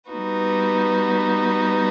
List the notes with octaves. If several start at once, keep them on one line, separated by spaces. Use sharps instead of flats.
G3 B3 D#4 F#4 B4